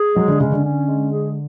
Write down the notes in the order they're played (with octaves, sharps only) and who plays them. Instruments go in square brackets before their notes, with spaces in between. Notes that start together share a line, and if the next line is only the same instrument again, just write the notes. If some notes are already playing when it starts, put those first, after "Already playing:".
Already playing: [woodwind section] G#4
[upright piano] F#3 [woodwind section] G#3
[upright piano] D3
[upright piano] C#3 [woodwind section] C#4
[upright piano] D3
[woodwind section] C#4
G#3
G#4